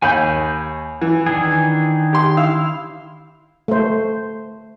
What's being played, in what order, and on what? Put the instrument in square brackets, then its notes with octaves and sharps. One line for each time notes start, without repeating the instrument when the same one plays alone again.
[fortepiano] D#2 [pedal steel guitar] G#5 B5 G6
[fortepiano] E3
[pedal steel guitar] D#3 D4 G#4
[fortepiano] G4 C6
E4 F5 E6
[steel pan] A3 C5